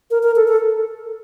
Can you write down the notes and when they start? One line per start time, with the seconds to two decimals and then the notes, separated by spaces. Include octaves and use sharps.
0.11 A#4
0.23 A#4
0.36 A4
0.48 A4